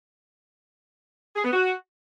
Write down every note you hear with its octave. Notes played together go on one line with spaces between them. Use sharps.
G#4
B3
F#4